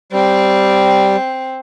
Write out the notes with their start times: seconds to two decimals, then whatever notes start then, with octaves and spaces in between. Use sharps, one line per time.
0.12 G3 C4